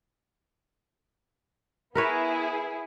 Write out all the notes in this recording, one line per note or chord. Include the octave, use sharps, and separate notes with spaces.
B3 E4 G#4 A#4 B4 C#5